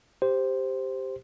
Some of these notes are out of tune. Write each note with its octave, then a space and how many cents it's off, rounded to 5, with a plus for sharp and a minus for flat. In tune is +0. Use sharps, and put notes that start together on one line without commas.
G4 +0 C5 +0